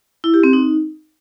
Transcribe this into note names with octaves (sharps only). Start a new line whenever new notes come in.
E4
G4
C4
D#4